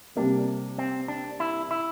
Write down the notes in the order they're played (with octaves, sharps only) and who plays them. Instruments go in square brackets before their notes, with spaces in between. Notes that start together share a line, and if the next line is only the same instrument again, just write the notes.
[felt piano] C3 G3 A#3 [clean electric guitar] D4
[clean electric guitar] C4
D4
E4
E4